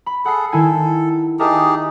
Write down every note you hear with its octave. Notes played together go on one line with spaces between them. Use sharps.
B5
G#4 A4 F#5 C7
D#3 E4 A4 G#5
D#4 G4 G#4 A#4 E5 A5